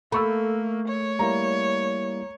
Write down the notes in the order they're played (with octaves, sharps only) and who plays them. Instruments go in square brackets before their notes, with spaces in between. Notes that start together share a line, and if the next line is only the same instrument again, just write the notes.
[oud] A3 [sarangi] A#3 [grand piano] B5 C#6 E6
[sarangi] C#5
[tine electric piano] G3 A#3 E4 [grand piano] A#5